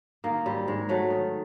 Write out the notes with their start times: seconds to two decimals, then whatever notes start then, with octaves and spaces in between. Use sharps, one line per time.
0.24 D#3 A#3
0.46 G#2 G3
0.67 G#2 G#3
0.89 F#3 A3
1.10 D#3